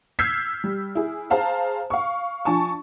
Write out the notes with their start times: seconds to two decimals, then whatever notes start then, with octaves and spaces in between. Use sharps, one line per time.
0.19 E6 F6 G6 G#6 B6 C7
0.64 G3
0.95 E4 G#4
1.30 G#4 C5 F5 A5 A#5
1.90 F5 C#6
2.45 F3 D4 G#5 A5 C#6